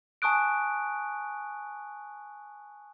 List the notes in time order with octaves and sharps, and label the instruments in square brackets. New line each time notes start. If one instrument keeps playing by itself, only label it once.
[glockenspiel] G#5 A5 C#6 D#6 F#6 D7